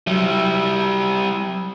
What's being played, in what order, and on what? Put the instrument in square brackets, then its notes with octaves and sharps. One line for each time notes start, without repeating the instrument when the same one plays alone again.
[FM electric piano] F#3 E6 [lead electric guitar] G3 E4